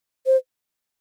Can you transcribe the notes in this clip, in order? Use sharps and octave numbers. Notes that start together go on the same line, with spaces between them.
C5